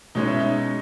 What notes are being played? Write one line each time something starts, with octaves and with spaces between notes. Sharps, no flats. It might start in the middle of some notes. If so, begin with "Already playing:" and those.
B2 G#3 C#4 D#4
E4
D#4